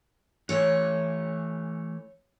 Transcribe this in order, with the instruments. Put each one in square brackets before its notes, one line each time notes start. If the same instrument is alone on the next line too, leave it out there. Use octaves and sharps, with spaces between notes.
[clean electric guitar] E3 A3 C#4 [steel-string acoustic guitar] C#5